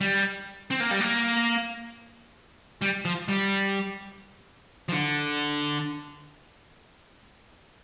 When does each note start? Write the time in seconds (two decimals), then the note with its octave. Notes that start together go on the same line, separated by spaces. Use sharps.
0.01 G3
0.71 C4
0.80 A#3
0.91 G3
1.01 A#3
2.82 G3
3.05 F3
3.28 G3
4.89 F3
4.92 D3